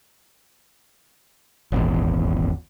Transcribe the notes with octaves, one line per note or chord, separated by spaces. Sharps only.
D#1 G#1 E2